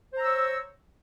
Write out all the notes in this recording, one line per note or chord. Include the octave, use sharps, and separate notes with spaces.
C5 C#5 A#5 E6